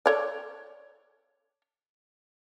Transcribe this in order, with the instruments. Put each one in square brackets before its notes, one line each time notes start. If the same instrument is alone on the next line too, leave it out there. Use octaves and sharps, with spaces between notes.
[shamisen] A4 C#5 D5